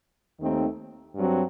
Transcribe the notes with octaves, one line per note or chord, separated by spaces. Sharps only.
D#2 D#3 A3 C4 D#4
G2 F#3 C4